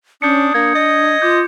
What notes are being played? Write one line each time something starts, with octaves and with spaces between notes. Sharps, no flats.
C#4 D4 D#6 G6 C#7
A#3 D4 G#6
D#5
F4 D6 G6